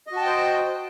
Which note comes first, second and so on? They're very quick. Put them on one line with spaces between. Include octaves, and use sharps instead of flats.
D#5 F#4 A5 G5 C5